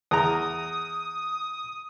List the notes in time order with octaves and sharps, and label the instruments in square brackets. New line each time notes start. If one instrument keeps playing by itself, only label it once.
[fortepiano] E2 A#5 [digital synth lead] D#6